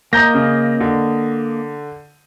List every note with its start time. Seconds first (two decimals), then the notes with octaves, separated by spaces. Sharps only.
0.13 A#3 D#5 A#5 G6 A#6
0.34 C#3
0.80 D3